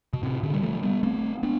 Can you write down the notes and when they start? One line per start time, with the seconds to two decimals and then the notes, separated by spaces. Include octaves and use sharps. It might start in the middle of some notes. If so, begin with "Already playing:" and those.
0.13 B2
0.23 A2 C3
0.43 B2 D3
0.53 G3
0.63 F3 A3
0.83 G3 B3
1.03 A3 C4
1.43 B3 D4